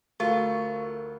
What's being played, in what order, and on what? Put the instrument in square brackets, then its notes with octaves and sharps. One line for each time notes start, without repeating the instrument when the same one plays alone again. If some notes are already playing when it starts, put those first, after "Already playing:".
[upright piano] D2 [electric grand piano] A3 C#6 [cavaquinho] F4 [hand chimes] A#4